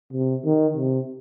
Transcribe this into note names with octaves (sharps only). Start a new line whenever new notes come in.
C3
D#3
C3